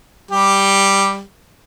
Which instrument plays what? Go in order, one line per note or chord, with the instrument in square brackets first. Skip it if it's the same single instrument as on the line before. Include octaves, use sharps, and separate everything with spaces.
[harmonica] G3 G4